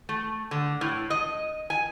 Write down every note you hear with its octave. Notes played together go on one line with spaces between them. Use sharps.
A3
D3
A2
D#5
G#5